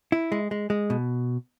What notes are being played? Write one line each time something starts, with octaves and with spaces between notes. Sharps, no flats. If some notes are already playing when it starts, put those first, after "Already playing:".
E4
G#3
G#3
G#3
B2